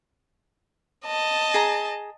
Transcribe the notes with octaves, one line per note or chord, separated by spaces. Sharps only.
D#5 A5
G#4 A#5